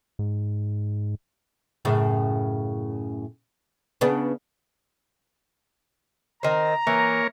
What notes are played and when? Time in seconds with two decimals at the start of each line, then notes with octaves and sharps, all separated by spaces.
0.19 G#2
1.85 F#2 A2 C#3
4.01 C#3 B3 D4
6.43 D#3 C4 A#5
6.87 E3 A#3 A#4 C#5